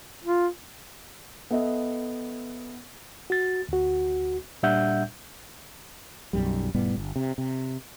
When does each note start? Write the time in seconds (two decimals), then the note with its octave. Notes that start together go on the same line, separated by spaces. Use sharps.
0.24 F4
1.51 B3 A4 D#5 E5
3.30 F#4 A6
3.69 D2 F#4
4.63 A#2 G3 D4 E5 F#5 G6
6.33 B1 F#2 G3
6.74 F1 A2 G3 B3
6.96 G1
7.16 C3
7.38 C3